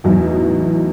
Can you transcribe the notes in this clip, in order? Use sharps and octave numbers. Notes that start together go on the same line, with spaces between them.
E2 A2 F#3 D#4